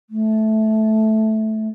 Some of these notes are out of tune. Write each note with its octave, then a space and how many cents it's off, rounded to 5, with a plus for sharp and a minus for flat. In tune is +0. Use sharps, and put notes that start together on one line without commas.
A3 -10